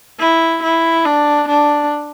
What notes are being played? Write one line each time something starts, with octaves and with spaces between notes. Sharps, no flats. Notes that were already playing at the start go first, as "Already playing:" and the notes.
E4
E4
D4
D4